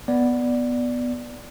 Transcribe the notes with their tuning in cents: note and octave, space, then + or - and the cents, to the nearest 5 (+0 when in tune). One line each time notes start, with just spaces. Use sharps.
B3 +0 D5 +0